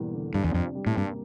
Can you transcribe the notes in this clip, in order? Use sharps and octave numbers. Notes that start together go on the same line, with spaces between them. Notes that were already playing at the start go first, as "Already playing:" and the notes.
Already playing: E1 E2 G3 A#3
D3
G2 D4
E2
F2 C3
G3
A2
G2 A#3